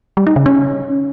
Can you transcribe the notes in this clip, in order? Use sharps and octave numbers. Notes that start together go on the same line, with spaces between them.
G3
D#4
C#3
C#4